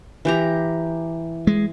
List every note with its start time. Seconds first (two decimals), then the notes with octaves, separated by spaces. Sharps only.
0.25 E3 G4 A#5
1.47 G#3